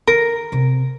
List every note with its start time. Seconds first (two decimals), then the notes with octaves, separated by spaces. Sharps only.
0.07 D#3 A#4
0.52 C3 C4